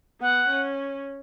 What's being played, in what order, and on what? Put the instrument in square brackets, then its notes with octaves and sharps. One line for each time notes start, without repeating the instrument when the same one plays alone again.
[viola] B3 [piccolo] F#5
[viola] C#4